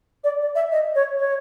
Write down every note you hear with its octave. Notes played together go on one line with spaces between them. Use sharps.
D5
D5
E5
D#5
C#5
C#5